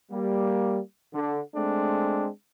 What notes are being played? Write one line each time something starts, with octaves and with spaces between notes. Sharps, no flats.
G3 A#3
D3
G#3 A3 C4 D4